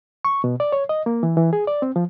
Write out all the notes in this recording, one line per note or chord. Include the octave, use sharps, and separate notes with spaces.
C#6
B2
D5
C#5
D#5
A#3
E3
E3
G#4
D5
C4
F3